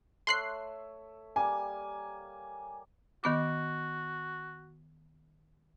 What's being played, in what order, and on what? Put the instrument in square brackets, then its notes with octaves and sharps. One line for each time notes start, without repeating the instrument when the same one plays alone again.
[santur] A3 C#5 E5 [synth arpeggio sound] C6 F#6 C7
[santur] G3 A#3 [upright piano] G#5
[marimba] D#3 B3 D6 [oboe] F#4